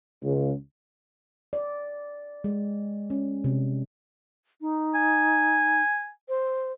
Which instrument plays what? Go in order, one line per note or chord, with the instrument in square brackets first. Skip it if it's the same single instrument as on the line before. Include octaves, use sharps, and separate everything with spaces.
[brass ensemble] C#2
[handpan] D5
G#3
C#4
C3
[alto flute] D#4
[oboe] G#5
[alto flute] C5